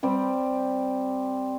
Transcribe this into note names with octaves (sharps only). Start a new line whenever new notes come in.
G3 C4 G4